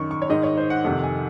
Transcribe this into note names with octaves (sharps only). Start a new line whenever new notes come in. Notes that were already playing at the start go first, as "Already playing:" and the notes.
Already playing: F#2 D#3 C#6
C#6
C#5
G#2 D#3 D#5
C#5
C5
F#5
F2 C3 D#3 F#5
G#5